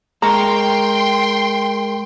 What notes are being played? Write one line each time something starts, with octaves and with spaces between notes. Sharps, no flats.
G#3 A#4 G5 A#5 C6 C#6